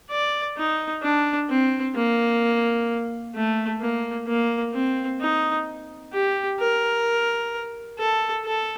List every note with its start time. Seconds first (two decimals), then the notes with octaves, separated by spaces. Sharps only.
0.10 D5
0.57 D#4
1.03 D4
1.50 C4
1.96 A#3
3.35 A3
3.81 A#3
4.27 A#3
4.74 C4
5.21 D#4
6.13 G4
6.60 A#4
7.99 A4
8.45 A4